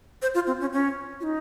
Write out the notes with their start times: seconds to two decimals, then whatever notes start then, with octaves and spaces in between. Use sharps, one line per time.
0.22 C5
0.34 F4
0.47 C4
0.60 C#4
0.73 C#4
1.20 F4
1.23 D#4